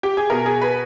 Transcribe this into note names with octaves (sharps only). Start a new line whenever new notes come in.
G4
G#4
B2 A#4
G#4
B4